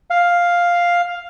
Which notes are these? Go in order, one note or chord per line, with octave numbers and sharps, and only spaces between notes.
F5